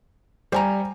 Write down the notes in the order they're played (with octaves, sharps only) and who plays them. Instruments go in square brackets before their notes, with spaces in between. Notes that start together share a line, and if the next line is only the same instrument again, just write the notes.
[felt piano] G3 G#5 [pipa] C5 A#5